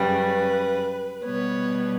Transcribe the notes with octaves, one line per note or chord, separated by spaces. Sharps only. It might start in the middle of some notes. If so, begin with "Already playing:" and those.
Already playing: F#2 C#3 G3 B4
B2 G3 B3 C#5